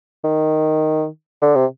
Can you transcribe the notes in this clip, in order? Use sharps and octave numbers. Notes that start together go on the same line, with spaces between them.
D#3
D3
C3